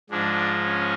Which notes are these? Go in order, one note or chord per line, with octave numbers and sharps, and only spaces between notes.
G#2 F3 G#3 D4
C#4